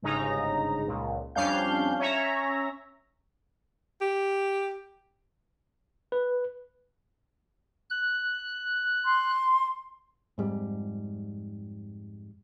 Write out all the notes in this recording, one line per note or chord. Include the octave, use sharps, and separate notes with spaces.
G1 G#2 C#3 D#4 A#5
C#2 A#2
F2 G3 C#4 D4 F5 G6
C#4 C#5 E5 A#5
G4
B4
F#6
C6
F2 G#2 G3